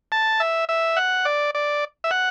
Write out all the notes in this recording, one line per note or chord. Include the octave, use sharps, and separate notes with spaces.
A5
E5
E5
F#5
D5
D5
E5
F#5